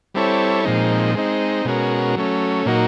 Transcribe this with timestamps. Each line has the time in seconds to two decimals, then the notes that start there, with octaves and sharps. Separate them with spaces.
0.14 G3 C4 E4 A4 C#5
0.65 A#2 F3 G#3 C4 D#4
1.15 G#3 C4 D#4
1.65 B2 G#3 C#4 F#4 A#4
2.16 F#3 A3 C#4
2.66 A#2 F#3 A#3 D#4 F#4